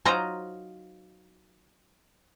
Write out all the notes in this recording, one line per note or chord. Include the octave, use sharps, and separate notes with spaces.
F#3 D#4 F4 C5 A#5